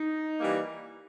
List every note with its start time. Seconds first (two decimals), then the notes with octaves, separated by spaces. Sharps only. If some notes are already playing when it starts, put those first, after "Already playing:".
Already playing: D#4
0.40 E3 G3 A#3